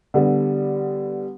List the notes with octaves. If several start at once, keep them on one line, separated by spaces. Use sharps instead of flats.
D3 G3 B3